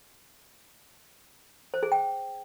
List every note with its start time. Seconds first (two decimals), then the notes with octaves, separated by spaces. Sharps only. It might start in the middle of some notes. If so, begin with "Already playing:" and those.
1.74 C5
1.83 G#4
1.92 G5